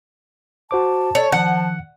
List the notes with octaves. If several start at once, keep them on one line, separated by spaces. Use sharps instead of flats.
F#4 C5 A5 D6
A4 C#5
D#3 F3 F#5 C#7